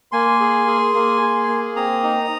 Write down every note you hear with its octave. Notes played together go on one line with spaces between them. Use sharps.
A#3 G#5 C6
G#4
G#4
A#3
G#4
A#3
C4 A#5 D#6
D#4